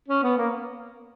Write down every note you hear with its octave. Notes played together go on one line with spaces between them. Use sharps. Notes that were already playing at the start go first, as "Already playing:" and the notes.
C#4
B3
A#3